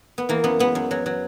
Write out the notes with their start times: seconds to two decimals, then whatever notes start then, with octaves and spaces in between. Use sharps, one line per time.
0.18 B3
0.29 E3 A#3
0.44 F#2 B3
0.59 G#3 B3
0.75 F#2
0.91 F#3
1.06 F#3